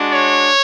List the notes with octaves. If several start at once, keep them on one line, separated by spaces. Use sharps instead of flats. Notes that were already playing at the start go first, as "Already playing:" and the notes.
Already playing: G#3 D4 F#4
C#5